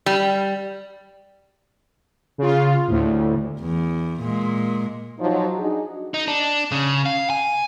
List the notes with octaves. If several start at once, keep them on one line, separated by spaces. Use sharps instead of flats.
G3
C#3 F4
D2 A2
E2
A#2 G#3
F3 F#3 D#4
D4 D#4 F#4 G#4
D#4
D4
C#3
F5
G#5